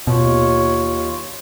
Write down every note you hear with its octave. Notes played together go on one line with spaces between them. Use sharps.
D#2 B2 F4 C#5